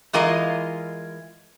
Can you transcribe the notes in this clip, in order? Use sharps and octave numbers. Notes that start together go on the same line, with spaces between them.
E3 G#3 F4 A#4 D#5